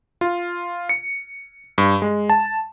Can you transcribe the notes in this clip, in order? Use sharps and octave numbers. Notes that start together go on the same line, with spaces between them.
F4
C#7
G2
G#3
A5